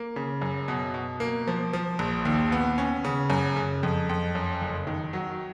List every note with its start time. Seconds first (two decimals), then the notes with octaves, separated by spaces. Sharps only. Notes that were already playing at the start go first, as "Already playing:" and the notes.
Already playing: A#3
0.16 C#3
0.42 F#2
0.68 B2
0.94 B2
1.20 A#3
1.48 F3
1.73 F3
1.99 A#1
2.25 D#2
2.52 B3
2.78 C#4
3.05 C#3
3.30 F#2
3.56 C#3
3.83 F2
4.09 F2
4.35 F#2
4.62 F#1
4.87 D#3
5.13 F#3